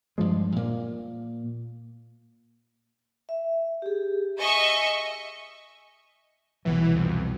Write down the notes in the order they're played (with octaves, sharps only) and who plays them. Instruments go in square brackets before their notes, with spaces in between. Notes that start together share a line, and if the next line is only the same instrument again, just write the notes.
[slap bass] G2 F3 G#3
A#2 A#3
[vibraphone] E5
G4 G#4
[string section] D#5 E5 C#6 [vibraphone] G#5
[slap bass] C2 B2 F#3 [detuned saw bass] E3
[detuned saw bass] F2